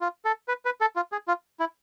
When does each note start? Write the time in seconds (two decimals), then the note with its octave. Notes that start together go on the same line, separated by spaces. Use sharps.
0.01 F4
0.25 A4
0.48 B4
0.65 B4
0.81 A4
0.96 F4
1.12 G#4
1.28 F4
1.60 E4